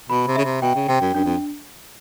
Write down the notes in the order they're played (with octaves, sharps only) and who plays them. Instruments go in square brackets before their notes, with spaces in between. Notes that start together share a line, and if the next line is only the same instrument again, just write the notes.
[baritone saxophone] B2 [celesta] B5
[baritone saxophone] C3
[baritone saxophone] C#3 [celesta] E5
[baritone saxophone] C3
[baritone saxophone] B2 [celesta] G5
[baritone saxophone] C#3
[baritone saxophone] C3 [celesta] G5
[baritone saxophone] F#2
[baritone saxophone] F#2 [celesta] D4
[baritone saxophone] F2